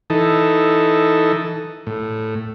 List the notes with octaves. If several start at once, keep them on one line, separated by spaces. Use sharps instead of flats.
E3 D#4 A4
A2